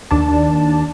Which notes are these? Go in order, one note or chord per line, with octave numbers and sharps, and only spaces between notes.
D#2 D4 A5